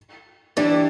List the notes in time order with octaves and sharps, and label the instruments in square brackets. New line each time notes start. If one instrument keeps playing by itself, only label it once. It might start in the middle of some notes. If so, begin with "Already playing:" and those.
[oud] E3 G3 [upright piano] D4